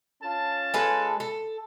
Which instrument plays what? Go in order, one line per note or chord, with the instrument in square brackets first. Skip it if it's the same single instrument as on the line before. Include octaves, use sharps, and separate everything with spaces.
[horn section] C#4 F4 A5
[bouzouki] G#3 A4 B4
A4